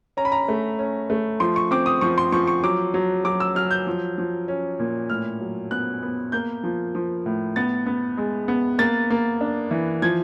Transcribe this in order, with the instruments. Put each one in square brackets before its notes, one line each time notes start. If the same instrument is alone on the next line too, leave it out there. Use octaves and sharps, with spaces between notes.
[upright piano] C#4 A#5
B5
A#5
A3
C#4
A3
F3 C6
C#6
C4 D6
D#6
F3 C#6
C6
F3 C#6
C#6
F#3 D6
F#3
F#3 D6
E6
F#3 F6
G6
F3
F3
C#4
A#2
A2 F6
F#3
B3 F#6
B3
A#3 G6
F3
F3
A2
B3 A6
B3
G#3
B3
A#3 A6
A#3
D4
E3
F3 G#6